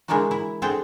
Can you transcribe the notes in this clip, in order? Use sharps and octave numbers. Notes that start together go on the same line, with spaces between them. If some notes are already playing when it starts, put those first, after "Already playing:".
E3 G#3 A#3 D4 D#4 F#4
E4
C4 D4 G#4 A4 G5